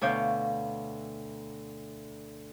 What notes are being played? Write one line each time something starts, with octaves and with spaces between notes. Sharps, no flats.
D2 B2 C#5 F5 D6 G6